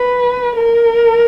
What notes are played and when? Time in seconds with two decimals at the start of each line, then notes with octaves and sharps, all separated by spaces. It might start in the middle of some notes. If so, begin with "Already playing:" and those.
Already playing: B4
0.56 A#4